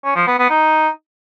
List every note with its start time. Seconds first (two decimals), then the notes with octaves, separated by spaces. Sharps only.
0.04 C#4
0.15 F3
0.27 B3
0.38 B3
0.49 D#4